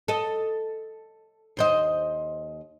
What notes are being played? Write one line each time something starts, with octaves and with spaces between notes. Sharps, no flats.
A4 D#5
D#2 C5 D#5